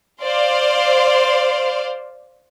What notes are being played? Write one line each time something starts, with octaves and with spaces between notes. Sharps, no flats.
C5 D5 F5